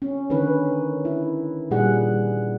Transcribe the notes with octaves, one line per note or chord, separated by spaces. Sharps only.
C#4
D3 D#3 C#4 B4
E4
A#2 G3 G#4 F#5